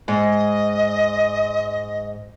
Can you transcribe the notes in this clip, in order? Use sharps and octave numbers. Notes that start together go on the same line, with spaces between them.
G#2 D#5